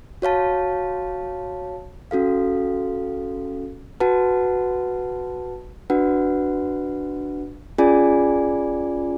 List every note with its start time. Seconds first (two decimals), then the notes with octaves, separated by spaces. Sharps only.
0.22 F#4 C#5 F5 A5
2.11 C#4 F#4 A4 F5
4.00 F#4 B4 F#5 A5
5.90 D4 F#4 B4 F#5
7.78 C#4 F4 G#4 D5 G#5